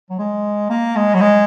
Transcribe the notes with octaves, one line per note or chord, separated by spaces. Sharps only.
F#3
G#3
A#3
G#3
F#3
G#3